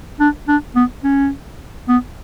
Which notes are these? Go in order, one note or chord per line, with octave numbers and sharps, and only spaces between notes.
D4
D4
B3
C#4
B3